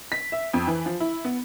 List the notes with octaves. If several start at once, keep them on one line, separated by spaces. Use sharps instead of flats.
B6
E5
F2
E3
F3
E4
B3